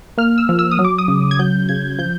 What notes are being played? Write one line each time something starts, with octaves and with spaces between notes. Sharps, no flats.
A#3 F6
E6
F3
E6
D#6
F#3
D6
D#6
C#3
G#6
F#3 G6
C#3 G#6
F3 G6